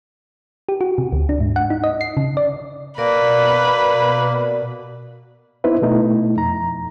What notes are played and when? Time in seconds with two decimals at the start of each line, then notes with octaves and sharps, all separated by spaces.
0.69 G4
0.81 F#4
0.98 C3
1.12 D2
1.29 D4
1.40 G#2
1.56 F#5
1.70 D#4
1.84 D#5
2.01 C7
2.17 C#3
2.37 D5
2.98 B2 A#3 A#4 B4 D5
5.64 B3 D#4 E4 B4 C5
5.82 B2 A3 D#4 E4
6.37 F2 A#5